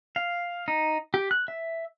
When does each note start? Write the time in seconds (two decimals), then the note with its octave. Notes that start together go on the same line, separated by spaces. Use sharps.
0.16 F5
0.68 D#4
1.14 G4
1.31 F#6
1.48 E5